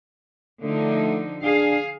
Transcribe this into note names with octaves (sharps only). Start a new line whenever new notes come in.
D3 F3 A3 D#4
D4 G#4 F5